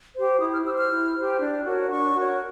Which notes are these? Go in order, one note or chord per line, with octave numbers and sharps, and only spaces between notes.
G4 C5
E4 D#6
F6
G4 C5 E6
F6
E4
G4 C5
D4
F#4 A#4 C#5
D4 C#6
F#4 A#4 C#5